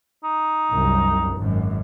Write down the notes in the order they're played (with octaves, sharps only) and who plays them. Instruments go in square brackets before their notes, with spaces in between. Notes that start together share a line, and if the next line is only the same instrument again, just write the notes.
[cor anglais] D#4
[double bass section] C2 F#2
G#1 F#2